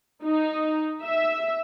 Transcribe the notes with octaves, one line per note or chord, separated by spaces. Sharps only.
D#4
E5